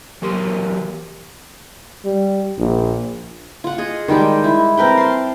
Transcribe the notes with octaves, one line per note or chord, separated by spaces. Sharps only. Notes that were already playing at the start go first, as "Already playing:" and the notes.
E3 F#3 G4 A#4 C6
G3
A#1
F4 F#5
G#4 D#5
D#3 G3 G#3 G4
E4
C4 A#4 B4 G5
A5 C6